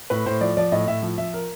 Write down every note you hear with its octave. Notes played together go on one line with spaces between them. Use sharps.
A2 B4
A2 C5
F3 D5
F3 D5
A2 D#5
A2 E5
F3
F3 E5
A#4